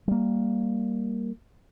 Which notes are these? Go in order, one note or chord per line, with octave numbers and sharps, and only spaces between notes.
G3 A#3